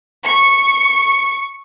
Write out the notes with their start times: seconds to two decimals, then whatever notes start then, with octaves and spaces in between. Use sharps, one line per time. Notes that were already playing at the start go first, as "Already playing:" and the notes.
0.23 C#6